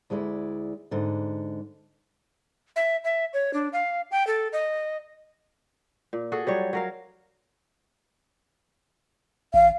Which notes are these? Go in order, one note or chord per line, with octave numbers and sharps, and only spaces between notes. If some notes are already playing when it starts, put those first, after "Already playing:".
D2 G#3 E4 D5
G#2 D3
E5
E5
C#5
D4
F5
G5
A4
D#5
A#2
F#4 G#4 A4
F#3 G3 C#5
F#3 A#4 F5
A1 F5